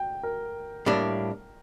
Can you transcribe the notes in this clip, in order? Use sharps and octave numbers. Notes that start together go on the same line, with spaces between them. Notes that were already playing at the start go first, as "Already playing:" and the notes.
Already playing: G5
A#4
A2 G3 A#3 D4